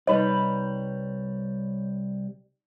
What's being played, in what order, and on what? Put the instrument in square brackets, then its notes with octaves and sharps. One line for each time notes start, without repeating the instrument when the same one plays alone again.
[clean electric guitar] C2 G3 B4 [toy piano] D#4 D#5 [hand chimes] C#5